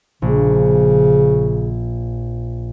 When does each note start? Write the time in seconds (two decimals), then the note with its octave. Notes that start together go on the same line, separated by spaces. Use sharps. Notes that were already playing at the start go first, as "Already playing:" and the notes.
0.22 A#1 C#3